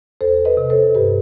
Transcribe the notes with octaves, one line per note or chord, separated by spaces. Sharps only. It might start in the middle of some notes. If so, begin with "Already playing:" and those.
E2 A4 C5
B4 D#5
C3
A4 C5
G2 G4 B4